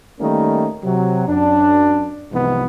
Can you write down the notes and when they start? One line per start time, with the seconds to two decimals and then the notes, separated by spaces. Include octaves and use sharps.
0.20 D#3 G3 A3 A#3 C#4 D#4
0.84 C3 F#3
1.28 F#2 D4
2.32 C2 G#2 C3 E3 F3 B3